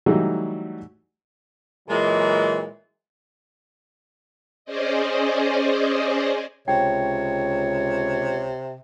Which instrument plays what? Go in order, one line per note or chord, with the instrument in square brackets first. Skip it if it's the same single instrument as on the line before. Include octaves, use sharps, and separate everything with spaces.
[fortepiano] E3 F#3 G3 A3 D#4 F#4
[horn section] A#2 E3 F#3 G#3
[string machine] C#4 G#4 C5 D5 D#5
[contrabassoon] C#2 [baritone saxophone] C3 [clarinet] C#5 [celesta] G5